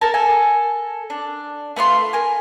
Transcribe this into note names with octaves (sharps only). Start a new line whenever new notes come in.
A4 A#4 G#5 A5
A4 A#4 G#5
D4
A3 B3 F4 C6
A#4 G#5